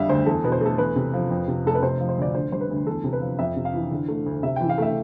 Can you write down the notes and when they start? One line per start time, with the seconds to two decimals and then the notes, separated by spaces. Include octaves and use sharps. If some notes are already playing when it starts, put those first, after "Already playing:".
Already playing: F2 D3 G3 E5 F5
0.09 D2 C5
0.26 E2 A4
0.44 B2 B4
0.52 C5
0.61 A3 A4
0.78 E2 B4
0.96 C3
1.13 F3
1.30 F2
1.48 C3
1.65 F1 A4
1.75 B4
1.82 C3 C5
2.00 F3
2.09 C5
2.17 D2 D5
2.35 D3 C5
2.52 G3 C5
2.61 B4
2.70 D2
2.87 E2 A4
3.04 C3
3.13 B4
3.21 F3
3.39 F2 E5
3.56 C3
3.65 F5
3.74 E3
3.91 D3
4.08 A3
4.26 D2
4.43 C3 E5
4.56 E3 G5
4.69 F5
4.78 A3 E5